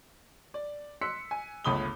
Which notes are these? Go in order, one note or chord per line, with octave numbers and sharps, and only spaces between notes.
D5
C6 E6 F#6 B6 C#7
G#5
G1 C#2 A3 B5 D#6 G7